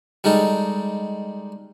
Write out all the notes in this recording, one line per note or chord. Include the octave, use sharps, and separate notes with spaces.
G3 G#3 D#4 A4